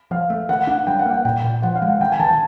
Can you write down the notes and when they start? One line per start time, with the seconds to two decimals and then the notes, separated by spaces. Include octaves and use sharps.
0.11 F3 F5
0.30 A3
0.49 D#3 F#5
0.67 D4 F#5
0.87 G3 G5
0.99 F#5
1.06 A#3
1.13 F#5
1.25 A#2 G5
1.44 A#2
1.62 F3 F#5
1.76 F5
1.82 G#3
1.88 F#5
2.00 D#3 G5
2.12 G#5
2.20 D#3 A5